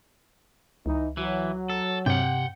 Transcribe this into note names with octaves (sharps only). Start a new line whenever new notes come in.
C#2 E3 D#4
E3 F#3
A4
G2 C3 F#5 G5